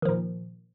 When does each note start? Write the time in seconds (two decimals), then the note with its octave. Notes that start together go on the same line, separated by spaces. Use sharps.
0.02 D#3
0.05 F3
0.08 A#2